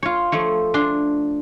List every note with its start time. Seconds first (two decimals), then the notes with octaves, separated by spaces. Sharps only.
0.03 F4 C#5
0.32 F3 A3 C#5
0.74 D4 C6